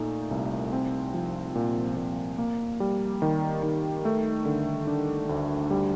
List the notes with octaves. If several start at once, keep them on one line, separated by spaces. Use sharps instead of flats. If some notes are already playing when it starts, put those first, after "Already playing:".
Already playing: A#2 A3 D#4
C2
C4
F3
A#2
A#2
A#3
G3
D#3
D#3
A3
D3
D4
D2
G3